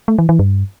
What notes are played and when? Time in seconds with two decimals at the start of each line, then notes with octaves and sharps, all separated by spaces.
0.08 A3
0.19 E3
0.29 E3
0.39 G2